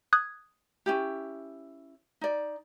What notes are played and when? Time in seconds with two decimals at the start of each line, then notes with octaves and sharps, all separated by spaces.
0.13 D#6 F#6 G#6
0.86 C#4 E4 G4
2.21 D#4 D5